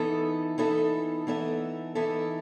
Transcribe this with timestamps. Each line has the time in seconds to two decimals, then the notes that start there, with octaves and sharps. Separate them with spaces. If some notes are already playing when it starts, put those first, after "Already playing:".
Already playing: E3 B3 D#4 A4 E5
0.58 E3 B3 D#4 A4 E5
1.27 E3 B3 D#4 A4 E5
1.95 E3 B3 D#4 A4 E5